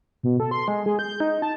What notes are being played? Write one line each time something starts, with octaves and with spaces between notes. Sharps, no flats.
B2
A4
C6
G#3
G#4
G6
D#4
A5